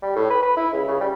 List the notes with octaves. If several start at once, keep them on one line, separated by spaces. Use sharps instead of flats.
G3
A2
B4
B4
E4
C#2
C#3
G3